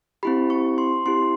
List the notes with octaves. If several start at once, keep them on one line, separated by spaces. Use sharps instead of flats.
C4 E4 G4 B5
C#6
C6
C4 E4 G4 C6